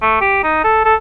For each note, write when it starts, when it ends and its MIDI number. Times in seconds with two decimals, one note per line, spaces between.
0.02 0.18 57
0.21 0.41 67
0.43 0.63 63
0.64 0.83 69
0.85 0.95 69